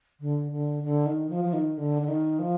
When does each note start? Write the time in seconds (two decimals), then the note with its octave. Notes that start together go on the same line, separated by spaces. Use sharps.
0.20 D3
0.52 D3
0.83 D3
1.06 D#3
1.30 F3
1.44 F3
1.53 D#3
1.77 D3
2.02 D3
2.08 D#3
2.39 F3